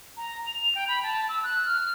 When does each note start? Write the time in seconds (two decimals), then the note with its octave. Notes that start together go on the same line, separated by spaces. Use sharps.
0.17 A#5
0.47 F7
0.75 G5
0.88 B5
1.03 A5
1.29 E6
1.44 F#6
1.66 F6